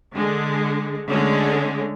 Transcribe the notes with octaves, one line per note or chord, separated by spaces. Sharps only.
D3 G#3
D3 G#3 A3 C#4